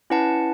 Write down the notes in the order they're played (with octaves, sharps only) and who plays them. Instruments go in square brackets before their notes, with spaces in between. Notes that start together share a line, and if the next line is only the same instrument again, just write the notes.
[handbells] C#4 E4 B4 F#5 A5